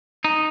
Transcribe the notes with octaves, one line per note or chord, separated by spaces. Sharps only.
D#4